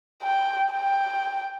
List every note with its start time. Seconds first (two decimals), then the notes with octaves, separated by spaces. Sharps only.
0.23 G5
0.73 G5